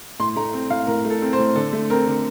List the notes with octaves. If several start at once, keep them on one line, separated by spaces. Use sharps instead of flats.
A2 C6
A3 A#5
C4
A2 F5
A2 A#4
A3
A4
C4
C5
A2
D3 A4
A3
C4 A#4
D3